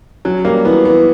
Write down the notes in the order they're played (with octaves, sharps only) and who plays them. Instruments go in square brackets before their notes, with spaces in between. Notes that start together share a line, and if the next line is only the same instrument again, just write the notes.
[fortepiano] F#3 [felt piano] C#4
[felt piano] G3 [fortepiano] A#3
[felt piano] E3 [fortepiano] B3
[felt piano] E3 [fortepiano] B3